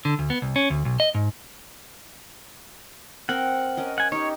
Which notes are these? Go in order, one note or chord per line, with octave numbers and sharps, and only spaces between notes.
D3
D2
B3
C2
C#4
D2
B1
D#5
G#2
C4 A#4 F#5
C#4 A#4 D#5
F#5 G#5
D#4 G4 C#5